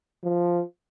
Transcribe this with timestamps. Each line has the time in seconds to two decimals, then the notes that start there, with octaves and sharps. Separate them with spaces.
0.24 F3